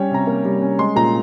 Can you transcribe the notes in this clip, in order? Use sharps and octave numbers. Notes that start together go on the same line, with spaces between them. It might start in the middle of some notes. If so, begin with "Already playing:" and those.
Already playing: G3 C#4 C#5 G5
C3 A#5
A#3
G3
C#4
G#3 C6
A#2 A#5